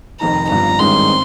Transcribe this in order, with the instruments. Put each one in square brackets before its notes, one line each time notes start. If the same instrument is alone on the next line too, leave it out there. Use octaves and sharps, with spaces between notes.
[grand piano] F1 F2 D#3 [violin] A#5
[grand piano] G1 G2 F3 [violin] A#5
[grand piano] G#1 G2 D#3 G#3 C#4 [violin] C6
[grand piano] C4